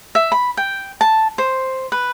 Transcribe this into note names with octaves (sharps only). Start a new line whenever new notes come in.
E5
B5
G5
A5
C5
B4